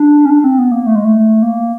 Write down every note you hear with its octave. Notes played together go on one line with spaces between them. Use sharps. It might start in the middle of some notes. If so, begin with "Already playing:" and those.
Already playing: D4
C#4
D4
C4
B3
A#3
A3
G#3
A3
A#3